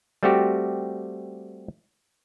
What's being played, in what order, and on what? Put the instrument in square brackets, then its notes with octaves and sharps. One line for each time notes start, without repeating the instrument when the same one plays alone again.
[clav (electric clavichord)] G3 A3 C4 F#4 G4